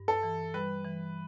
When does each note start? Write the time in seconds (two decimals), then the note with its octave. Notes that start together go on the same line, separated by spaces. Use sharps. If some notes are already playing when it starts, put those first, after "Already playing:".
Already playing: G2
0.08 A4
0.23 E3
0.54 G3 B4
0.84 E3